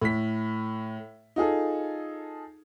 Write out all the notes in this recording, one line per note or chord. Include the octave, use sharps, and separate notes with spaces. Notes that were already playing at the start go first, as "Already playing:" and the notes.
A2 B6
D#4 F4 G#4 A4